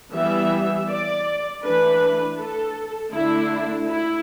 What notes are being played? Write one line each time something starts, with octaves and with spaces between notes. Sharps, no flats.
E3 G3 B3 E5
D5
E3 A3 D4 B4
A4
D3 A3 D4 E4
E4